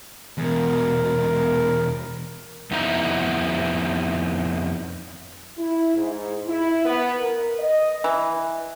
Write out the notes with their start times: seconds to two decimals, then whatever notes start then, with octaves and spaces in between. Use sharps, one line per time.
0.38 E2 B2 A#4
2.71 F2 B3 D#4 E4 A#5
5.58 E4
5.96 G#2
6.48 E4
6.85 B3
7.18 A#4
7.59 D#5
8.04 E3